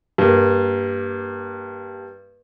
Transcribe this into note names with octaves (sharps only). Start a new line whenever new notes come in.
G2 A#3